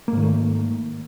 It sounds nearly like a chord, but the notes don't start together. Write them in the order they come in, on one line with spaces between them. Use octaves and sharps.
A#3 G#2 D#3 A3